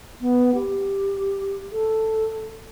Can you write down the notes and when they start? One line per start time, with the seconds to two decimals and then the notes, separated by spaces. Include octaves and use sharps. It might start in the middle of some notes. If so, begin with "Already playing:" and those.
0.21 B3
0.54 G4
1.72 A4